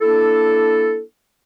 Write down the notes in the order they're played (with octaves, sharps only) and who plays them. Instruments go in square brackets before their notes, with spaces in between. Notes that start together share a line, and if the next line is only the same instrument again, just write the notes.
[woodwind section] A#3 D4 E4 A4